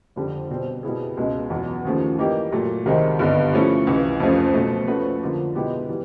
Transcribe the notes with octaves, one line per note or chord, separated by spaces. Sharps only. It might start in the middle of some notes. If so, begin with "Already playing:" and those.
F2 D3 G3
B2 G3 C4
B2 G3 B3 E4 G#4
C#2 B2 G#3
E2 B2 F#3
D#2 C#3 F3 A3
E3 G3 A#3 D#4 G4
A#2 F#3 A3
C2 C3 D#3 G#3 C4
G2 D3 G3 B3 D#4
F3 A3 C#4 E4
C#2 C3 E3
F2 C#3 F3 A3
B2 F#3 A3
F3 A3 C#4 F#4 B4
D3 F3 A#3
B2 G#3 B3 E4 G4
E3 G3 B3